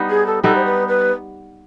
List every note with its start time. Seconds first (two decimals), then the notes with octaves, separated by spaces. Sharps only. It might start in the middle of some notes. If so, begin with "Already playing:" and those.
Already playing: G3 B3 D#4
0.10 G#4
0.27 A4
0.43 G3 B3 D#4 A4
0.55 C5
0.65 B4
0.88 B4